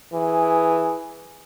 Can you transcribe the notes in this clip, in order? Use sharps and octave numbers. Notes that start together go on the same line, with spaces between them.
E3 G#4